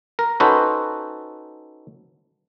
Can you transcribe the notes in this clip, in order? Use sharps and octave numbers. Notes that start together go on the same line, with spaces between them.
A#4
C#4 D#4 F#4 A4 B4 C5